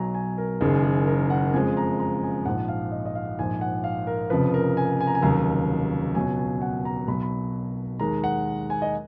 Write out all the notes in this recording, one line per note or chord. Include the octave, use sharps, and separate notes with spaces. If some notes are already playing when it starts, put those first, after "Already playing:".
Already playing: B1 B2 F#3 G#5 A#5
G#5
A#4
F#1 F#2 D#3 G#4
G#4
A#4
F#5
F2 C#3 F3 G#3 G#5
A#5
A#5
G#5
A#1 G#2 F3 F#5
F5
D#5
D#5
F5
A#1 G#2 F3 G#5
F#5
F5
A#4
F1 F2 C#3 F3 B4
A#4
G#5
G#5
A#5
G#5
F1 D#2 C#3 F#3 A#5
C#2 B2 F#3 G#5
G#5
F#5
A#5
B1 B2 F#3 B5
B5
D#2 D#3 G#3 A#5
F#5
G#5
D#5